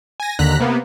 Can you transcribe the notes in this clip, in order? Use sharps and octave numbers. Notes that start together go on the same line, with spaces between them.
G#5 A#6
D#2 D3 A#5 F#6 B6
C3 A#3 B3